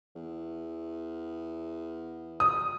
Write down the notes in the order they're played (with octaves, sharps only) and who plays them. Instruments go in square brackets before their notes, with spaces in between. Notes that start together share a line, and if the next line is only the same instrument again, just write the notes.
[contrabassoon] E2
[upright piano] D#6